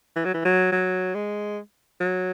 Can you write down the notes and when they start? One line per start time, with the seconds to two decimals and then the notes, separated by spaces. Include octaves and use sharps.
0.16 E3
0.25 F#3
0.34 E3
0.45 F#3
0.72 F#3
1.15 G#3
2.01 F#3